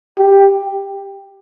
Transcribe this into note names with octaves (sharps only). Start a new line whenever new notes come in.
G4